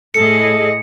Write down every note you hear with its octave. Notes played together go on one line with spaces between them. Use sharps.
A2 G#4 A4 D#5 C#7